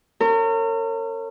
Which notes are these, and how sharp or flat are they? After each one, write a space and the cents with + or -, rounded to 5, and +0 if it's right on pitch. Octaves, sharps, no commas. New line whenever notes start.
C#4 -20 A#4 -40